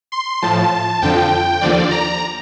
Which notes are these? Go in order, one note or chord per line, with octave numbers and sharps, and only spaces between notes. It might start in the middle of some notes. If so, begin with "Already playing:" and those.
C6
A2 F3 A5
F2 D3 F3 G5
D#2 D3 F3 D5
A#5